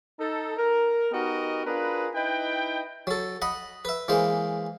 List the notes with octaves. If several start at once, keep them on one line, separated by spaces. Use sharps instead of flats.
D#4 A4
A#4
B3 D#4 F#4 G4 A#4 D#5
D4 F4 G#4 A#4 B4
D#4 E4 B4 D#5 G5
F#3 A4
D#5 F#5 B5
B4 E5
E3 G#3 A#3 C5